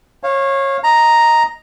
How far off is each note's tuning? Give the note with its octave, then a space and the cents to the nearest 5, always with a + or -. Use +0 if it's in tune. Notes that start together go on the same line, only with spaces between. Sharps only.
C#5 -25 F5 +0
D#5 +0 A#5 +0